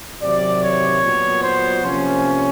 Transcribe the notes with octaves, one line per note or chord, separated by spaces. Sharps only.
C3 D#3 F#3 D5
C#5
A#2 F#3 B3
C5
C3 F3 A#3 C#4